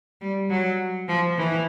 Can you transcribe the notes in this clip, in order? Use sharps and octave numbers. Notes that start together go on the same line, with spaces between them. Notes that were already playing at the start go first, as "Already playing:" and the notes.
G3
F#3
F3
E3